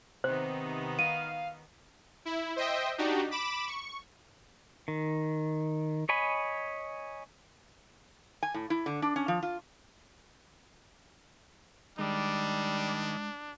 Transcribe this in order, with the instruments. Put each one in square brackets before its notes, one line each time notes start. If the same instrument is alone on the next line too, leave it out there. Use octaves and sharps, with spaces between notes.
[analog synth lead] C3 [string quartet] D#3 B3 D#4 [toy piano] C5
[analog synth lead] F5 [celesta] D#7
[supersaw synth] E4
C5 D#5 E5 G5
D4 D#4 F#4 G4
B5 D6 E7
C#6
[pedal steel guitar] D#3
C#5 D#5 G#5 B5
[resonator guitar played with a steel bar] G#5
A2
E4
D3
D4
C#4
F3
F4
[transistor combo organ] D#3 [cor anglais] G3 [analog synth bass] G#3 [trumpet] D4